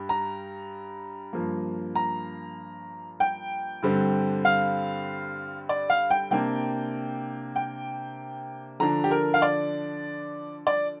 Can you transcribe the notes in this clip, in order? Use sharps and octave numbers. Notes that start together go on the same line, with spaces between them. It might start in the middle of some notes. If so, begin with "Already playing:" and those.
Already playing: G2 G3
A#5
G2 F3 A#3
A#5
G5
G2 D3 G3 C4
F5
D5
F5
G5
C3 A#3 D4 G5
G5
D3 F3 D4 A#5
G4
A#4
F5
D5
D5